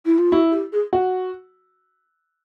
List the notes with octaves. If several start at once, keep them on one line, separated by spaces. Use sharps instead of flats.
E4
F4
E4 F#4
G4
G#4
F#4